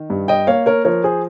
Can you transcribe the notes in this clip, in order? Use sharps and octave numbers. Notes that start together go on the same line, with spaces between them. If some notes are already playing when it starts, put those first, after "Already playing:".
Already playing: D#3
G2
D#5 G5
A#3 C#5 F5
A#4 C#5
F3 A#4 C#5
G#4 C5